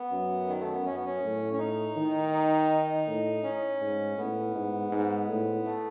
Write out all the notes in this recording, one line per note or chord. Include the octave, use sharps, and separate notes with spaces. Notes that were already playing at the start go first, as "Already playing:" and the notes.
Already playing: B3
F#2
D#3
A3
B3
F#2 C#4
B3
C#4
A2
C#4
D#4
D#3
D#4
A2
C#4
G#2
A2 B3
G#2
G#2
A2
A3